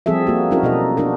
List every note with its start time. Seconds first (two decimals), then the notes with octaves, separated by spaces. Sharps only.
0.06 F3 G3 C4 G#4 A4 E5
0.27 A#3 F#4
0.51 F#3 C#4 D#4 E4 F#4 A#4
0.63 B2 A4 D#5
0.97 D4 D#4 F#4 A#4